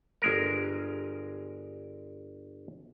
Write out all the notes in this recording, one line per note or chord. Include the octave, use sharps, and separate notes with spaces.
G1 G#3 A#4